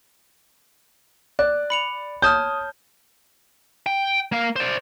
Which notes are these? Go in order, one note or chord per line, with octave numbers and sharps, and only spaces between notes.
D5 F#6
B5 C#7 F7
C#5 A5 D#6 F6 G6
G5
A#3 F5
C5 D5